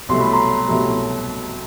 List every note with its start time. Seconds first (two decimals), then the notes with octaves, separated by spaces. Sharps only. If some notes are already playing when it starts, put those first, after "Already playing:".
0.09 C2 B2 F#3 A3 C6
0.21 B5
0.33 A#5 C6
0.68 C2 B2 F#3 A3